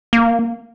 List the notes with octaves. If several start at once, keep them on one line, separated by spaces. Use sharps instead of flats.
A#3